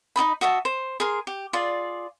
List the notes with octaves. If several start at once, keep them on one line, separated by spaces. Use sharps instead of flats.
D#4 E4 D#5 B5
F#4 D#5 E5 A5
C5
G#4 A#4 C6
G4
F4 G#4 D5